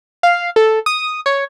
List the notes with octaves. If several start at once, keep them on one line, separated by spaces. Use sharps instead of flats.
F5
A4
D#6
C#5